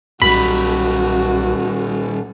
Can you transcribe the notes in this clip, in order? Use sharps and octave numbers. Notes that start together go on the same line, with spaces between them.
B1 A#2 G3 F#4 B5